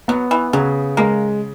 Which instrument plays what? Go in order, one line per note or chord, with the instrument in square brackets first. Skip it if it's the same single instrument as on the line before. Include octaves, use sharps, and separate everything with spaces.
[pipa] F#3 [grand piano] B3
[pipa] E3
[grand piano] C#3 [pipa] F#3
[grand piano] G#3 [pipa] A#3